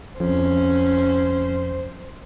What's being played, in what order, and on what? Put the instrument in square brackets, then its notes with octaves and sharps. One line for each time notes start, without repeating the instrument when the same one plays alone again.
[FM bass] F2 [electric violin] C#4 [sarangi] C5